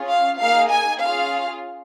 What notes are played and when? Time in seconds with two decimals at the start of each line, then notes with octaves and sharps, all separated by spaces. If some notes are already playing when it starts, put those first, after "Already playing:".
Already playing: C#4 F4 G#4
0.09 F5
0.39 A#3 D#4 G#4 F5
0.71 G#5
1.01 C#4 F4 G#4 F5